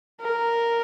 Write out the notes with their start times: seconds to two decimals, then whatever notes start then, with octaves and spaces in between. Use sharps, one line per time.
0.21 A#4